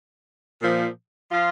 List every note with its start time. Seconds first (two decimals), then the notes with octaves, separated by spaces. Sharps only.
0.60 A#2 F3
1.31 F3 F4